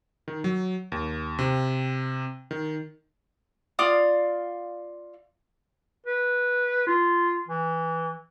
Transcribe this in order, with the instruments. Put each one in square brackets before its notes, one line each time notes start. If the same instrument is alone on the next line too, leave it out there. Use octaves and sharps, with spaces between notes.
[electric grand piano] D#3
F#3
D#2
C3
D#3
[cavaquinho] F4 D5 F5 D#6
[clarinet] B4
F4
E3